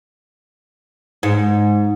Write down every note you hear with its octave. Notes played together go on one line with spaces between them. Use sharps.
G#2